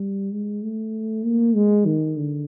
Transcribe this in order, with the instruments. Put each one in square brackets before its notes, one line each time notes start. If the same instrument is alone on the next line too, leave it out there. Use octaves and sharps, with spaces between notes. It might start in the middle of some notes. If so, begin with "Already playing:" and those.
Already playing: [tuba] G3
G#3
A3
A#3
G#3
D#3
D3